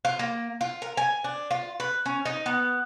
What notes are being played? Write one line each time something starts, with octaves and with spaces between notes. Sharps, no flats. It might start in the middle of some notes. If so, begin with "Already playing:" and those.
F4
A#3
F4
A#4
G#5
D4
F4
B4
C#4
D#4
B3